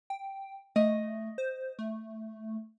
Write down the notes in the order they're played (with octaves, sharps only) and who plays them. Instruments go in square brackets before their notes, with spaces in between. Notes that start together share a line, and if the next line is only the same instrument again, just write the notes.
[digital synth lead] G5
[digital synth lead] A3 [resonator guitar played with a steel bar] D#5
[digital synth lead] C5
A3